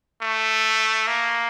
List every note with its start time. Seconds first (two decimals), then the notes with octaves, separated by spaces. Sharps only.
0.22 A3
1.07 A#3